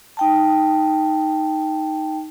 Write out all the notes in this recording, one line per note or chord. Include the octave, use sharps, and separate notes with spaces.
D#4 G5 A5